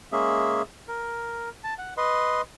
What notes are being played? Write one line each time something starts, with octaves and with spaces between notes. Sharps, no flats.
G#3 A#3 C#4 G#4 E5
A#4
A5
F#5
B4 D#5 C6